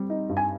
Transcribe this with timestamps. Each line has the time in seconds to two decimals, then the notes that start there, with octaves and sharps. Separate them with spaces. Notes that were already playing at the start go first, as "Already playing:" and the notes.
Already playing: G3 C4
0.10 D#4
0.29 G2
0.37 G#5